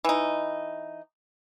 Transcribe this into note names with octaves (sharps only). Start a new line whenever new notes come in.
E3 D#4